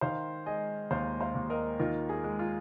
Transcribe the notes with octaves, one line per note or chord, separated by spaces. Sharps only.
D#3 C5 F5
G#3 D#5 G#5
D#2 C5 F5
C5 F5
D#2
A#4 D#5
D#3 F4 A#4
G#4
G#3
F4